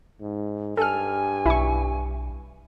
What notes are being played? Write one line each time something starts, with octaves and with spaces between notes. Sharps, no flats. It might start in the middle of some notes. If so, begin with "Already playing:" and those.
G#2
G2 A4 G#5 F6
B1 E4 C#6